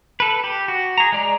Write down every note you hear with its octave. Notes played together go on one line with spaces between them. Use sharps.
A4 B4
G4
F#4
G#4 A#5
G#3 D5 A#5